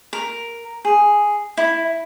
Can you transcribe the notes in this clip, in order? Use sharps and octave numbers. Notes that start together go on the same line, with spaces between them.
A#4
G#4
E4